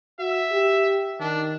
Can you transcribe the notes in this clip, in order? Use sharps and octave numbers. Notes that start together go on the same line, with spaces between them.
F#4 E5
G4
D#3 D4